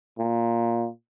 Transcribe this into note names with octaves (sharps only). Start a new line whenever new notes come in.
A#2